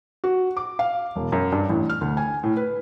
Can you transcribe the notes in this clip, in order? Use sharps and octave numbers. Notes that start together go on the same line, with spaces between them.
F#4
D6
F5
E1
F#2
G2
A1
F6
D2
G#5
A2
B4